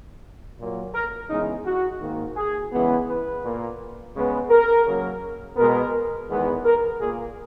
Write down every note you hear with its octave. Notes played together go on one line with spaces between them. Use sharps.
A#2 F#3 A#3
A#4
C#3 E3 G#3 B3 D#4
F#4
G#2 D#3 A#3
G#4
C#3 E3 G#3 B3
B4
A#2 A#3
C#3 G#3 B3
A#4
C#3 F#3 A#3
B2 G#3 B3 A#4
E2 D#3 G#3 B3
A#4
A#2 A#3 G#4